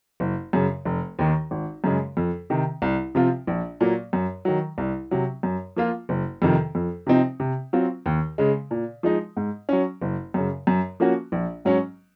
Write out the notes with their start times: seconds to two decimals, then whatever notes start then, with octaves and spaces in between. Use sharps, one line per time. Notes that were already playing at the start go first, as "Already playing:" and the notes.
0.20 F#1
0.53 F#2 C#3
0.85 F1
1.19 D#2 D#3
1.51 G#1
1.84 F#2 C#3 G#3
2.17 F2
2.50 C3 D#3
2.82 C2
3.15 C3 F3 C4 F4
3.47 A#1
3.81 A#2 F#3 A#3
4.13 F#2
4.45 D#3 F#3
4.78 C2
5.11 C3 F#3
5.43 F#2
5.76 F3 A#3 F4
6.09 F#1
6.42 F2 C3 D#3
6.75 F2
7.07 C3 F3 C4 D#4
7.40 C3
7.73 F#3 C4 F4
8.06 D#2
8.38 C#3 G#3
8.71 A#2
9.03 F3 G#3 D#4
9.37 G#2
9.69 F#3 C#4
10.02 F#1
10.34 F#2 C#3
10.67 F#2
11.00 F3 A#3 C#4 F#4
11.32 A#1
11.65 G#2 F#3 C#4